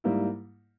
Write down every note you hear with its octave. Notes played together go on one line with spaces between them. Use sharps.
G#2 G3 A#3 E4